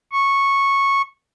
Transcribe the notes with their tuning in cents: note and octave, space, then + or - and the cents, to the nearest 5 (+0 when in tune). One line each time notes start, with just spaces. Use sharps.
C#6 -10